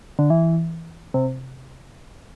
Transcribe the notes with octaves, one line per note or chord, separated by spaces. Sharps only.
D3
E3
C3